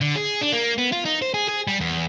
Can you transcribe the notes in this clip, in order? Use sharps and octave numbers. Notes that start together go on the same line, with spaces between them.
D3
G#4
D4
A#3
B3
F4
D#4
C5
G#4
G#4
G3
E2